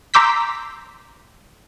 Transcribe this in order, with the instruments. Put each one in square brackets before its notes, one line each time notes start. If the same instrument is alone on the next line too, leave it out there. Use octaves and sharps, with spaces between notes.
[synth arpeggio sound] A#5 C6 D6 E6 G6 B6